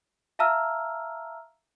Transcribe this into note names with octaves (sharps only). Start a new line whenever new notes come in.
E5 F5 A5 A#5 E6 F6